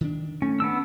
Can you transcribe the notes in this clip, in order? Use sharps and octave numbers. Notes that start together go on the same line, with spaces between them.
D#3 D4
A3 C#4
B3 D4 E6